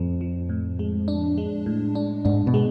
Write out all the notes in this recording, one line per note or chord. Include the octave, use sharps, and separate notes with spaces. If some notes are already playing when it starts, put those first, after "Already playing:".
Already playing: F2 A2 F3
F3
A2
G#3
D4
G#3
A2
D4
G#2 D4
B2
G#3